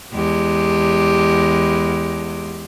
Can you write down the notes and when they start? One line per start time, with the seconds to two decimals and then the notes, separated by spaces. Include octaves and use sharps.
0.14 E2 G#3 G4